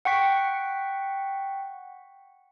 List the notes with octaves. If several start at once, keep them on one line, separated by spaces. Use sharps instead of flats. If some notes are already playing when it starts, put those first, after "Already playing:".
F#5 G5 C#6 B6